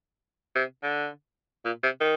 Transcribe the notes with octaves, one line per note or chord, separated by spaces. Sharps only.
C3
D3
A#2
C3
D#3